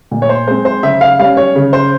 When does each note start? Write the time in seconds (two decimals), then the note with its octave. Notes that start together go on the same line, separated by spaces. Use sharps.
0.11 A#2
0.22 C#5
0.29 C5
0.47 G#3 C4 C5
0.65 C5
0.83 C#3 E5
1.01 F5
1.19 G3 C#4 F5
1.37 C#5
1.55 C#3
1.73 C5